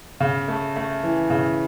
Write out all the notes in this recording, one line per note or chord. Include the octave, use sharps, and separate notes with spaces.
C#3
A3
A3
E3
C#3